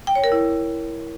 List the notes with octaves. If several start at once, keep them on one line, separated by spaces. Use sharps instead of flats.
G5
C#5
A#4
E4